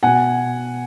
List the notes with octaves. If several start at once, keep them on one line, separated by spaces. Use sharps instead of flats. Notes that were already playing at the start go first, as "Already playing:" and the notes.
B2 F#5 G#5